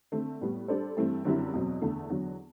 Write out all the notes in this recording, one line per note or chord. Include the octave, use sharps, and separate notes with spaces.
D3 A3 C4
A2 G3 B3
G3 D4 A4 C5
G2 E3 A3 C4
F#2 D3 G3 C4 E4
E2 B2 F#3 C4
E2 D3 A3
E2 D3 F#3